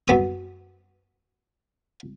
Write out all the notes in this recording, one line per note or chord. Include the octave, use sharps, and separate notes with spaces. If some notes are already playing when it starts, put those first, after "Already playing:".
F#2 B3 D#6